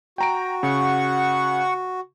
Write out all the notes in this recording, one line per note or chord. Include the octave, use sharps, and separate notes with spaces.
F#4 G5 A#5 D7
C#3 F#5 C#6